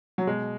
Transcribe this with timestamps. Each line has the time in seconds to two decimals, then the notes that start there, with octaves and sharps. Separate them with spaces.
0.18 F#3
0.27 B2 G#3